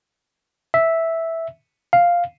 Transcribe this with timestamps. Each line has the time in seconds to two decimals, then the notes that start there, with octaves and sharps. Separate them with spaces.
0.74 E5
1.93 F5